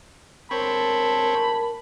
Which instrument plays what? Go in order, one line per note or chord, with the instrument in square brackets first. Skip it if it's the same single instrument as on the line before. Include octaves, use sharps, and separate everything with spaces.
[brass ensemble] G1 G#2 A5 [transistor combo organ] C4 C#5 [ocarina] A#4 [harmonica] B5